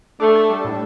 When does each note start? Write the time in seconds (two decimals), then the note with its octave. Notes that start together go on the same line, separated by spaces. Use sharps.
0.20 A3 D4
0.35 A4
0.50 G3
0.65 A2